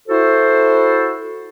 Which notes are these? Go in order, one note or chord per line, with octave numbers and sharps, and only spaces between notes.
E4 F#4 A4 C5